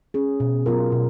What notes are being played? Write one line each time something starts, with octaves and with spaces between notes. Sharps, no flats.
C#4 G#4
B2
F#3 B3 F4 A#4
B2